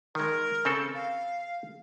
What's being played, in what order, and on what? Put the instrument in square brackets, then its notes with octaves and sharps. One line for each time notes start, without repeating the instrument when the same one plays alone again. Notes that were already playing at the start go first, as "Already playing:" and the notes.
[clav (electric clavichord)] D#3 G#3 [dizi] A#4
[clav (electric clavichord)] C#3 C4 A4
[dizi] F5